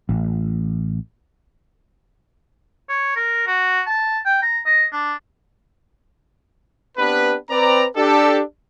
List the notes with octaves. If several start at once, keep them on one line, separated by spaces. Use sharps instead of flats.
A1
C#5
A#4
F#4
A5
G5
A#5
D#5
D4
B3 C4 D4 G4 B4
C4 B4 D5 A#5
D4 G4 A4